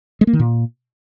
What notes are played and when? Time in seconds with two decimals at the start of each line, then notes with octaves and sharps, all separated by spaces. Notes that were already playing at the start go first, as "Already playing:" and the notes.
0.21 G#3
0.27 A#3
0.33 D#3
0.39 A#2